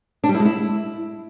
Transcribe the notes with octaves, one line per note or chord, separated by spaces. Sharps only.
D4
G3
E4
G#3
E4